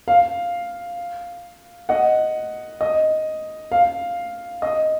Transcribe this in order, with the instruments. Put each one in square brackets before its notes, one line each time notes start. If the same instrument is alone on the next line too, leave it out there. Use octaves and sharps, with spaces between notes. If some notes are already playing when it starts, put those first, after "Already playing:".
[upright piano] F5
D#5 F#5
D#5
F5
D#5